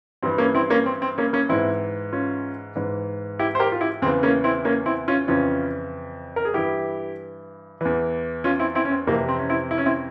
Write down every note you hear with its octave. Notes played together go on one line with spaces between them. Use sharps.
G2 E3 C4
A#3 C#4
C4 E4
A#3 C#4
C4
C4
A#3 C#4
A#3 C#4
G#2 E3 C4 E4
C#4 F4
G#2 E3
E4 G4
C5
G4 A#4
F4
E4 G4
E2 C#3 E3 C4
A#3 C#4
C4 E4
A#3 C#4
C4 E4
C#4 F4
F2 C#3 E3 C#4 F4
A#4
G#4
G2 E3 E4 G4
E2 E3
C#4 F4
C4 E4
C4 E4
C#4
C4
F2 C3 E3 A#3
C4
C#4
C4 E4
E4
C#4
C4 E4